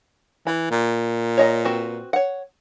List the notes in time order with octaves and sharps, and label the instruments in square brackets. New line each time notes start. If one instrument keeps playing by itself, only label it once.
[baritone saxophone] E3 [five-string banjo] B5
[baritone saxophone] A#2
[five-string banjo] C#5 D#5 A#5
C4 F#4 B4
C#5 F#5